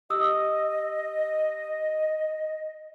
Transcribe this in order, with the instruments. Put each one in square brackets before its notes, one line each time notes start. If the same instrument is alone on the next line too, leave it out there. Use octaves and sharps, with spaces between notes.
[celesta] G4 D#6 E6 [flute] D#5